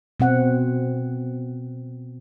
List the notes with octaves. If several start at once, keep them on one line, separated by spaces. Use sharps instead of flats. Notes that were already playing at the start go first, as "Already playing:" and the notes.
B2 C4 F#5